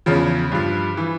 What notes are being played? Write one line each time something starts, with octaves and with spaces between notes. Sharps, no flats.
E2 C#3 F3
G2 F3
E3